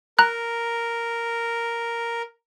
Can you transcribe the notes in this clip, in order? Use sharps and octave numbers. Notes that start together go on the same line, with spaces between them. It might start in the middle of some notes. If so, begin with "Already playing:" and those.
A#4 A#5 F#6